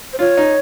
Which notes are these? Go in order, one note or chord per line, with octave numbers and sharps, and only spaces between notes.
C5
F4 C#5
D#4